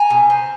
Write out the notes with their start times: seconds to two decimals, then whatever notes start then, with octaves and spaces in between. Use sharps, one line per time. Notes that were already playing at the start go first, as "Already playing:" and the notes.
Already playing: G#5 A#5
0.10 B2
0.30 C4